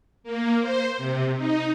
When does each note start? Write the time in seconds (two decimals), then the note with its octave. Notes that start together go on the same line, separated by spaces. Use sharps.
0.24 A#3
0.61 C5
0.97 C3
1.36 D#4